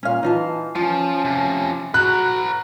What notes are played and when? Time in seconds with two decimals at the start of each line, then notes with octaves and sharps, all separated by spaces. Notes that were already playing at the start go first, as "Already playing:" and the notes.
0.03 A#2 C#4 F5
0.23 E3 D#4 F4 A5
0.75 F3 C#4 F4
1.25 C3 F3
1.94 F#4 B4 A#5 F#6